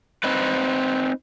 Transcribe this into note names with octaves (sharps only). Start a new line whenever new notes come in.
C4 D#4 B4